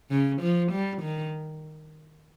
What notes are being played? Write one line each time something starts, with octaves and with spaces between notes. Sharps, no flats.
C#3
F3
G3
D#3